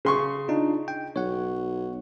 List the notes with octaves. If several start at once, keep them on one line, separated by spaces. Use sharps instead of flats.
C#3 C6 C#6
D4 D#4 F4
G5
B1 C#5 F#5